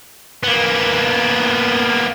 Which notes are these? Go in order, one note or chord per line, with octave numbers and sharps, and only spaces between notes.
A#3 B3